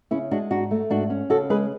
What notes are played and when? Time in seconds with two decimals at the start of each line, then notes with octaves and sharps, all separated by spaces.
0.11 C#3 C#4 E4
0.31 G#3 D4 F#4
0.51 G#2 D4 F#4
0.71 A3
0.90 G#2 D4 F#4
1.10 C#4
1.30 C#3 F#4 A4
1.50 G#3 G#4 B4